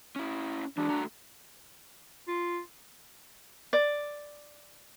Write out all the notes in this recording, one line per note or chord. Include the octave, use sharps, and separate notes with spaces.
C#4 E4
E3 G#3 D4 F#4
A3 F#4 A#5
F4
D5